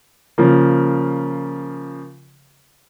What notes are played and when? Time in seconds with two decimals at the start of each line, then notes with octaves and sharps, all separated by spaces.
0.38 C#3 F3 A#3